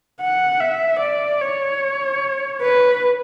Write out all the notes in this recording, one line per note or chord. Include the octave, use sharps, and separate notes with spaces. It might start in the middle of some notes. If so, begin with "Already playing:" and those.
F#5
E5
D5
C#5
B4